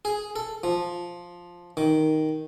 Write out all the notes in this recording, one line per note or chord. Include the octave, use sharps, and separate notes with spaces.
G#4
A4
F3
D#3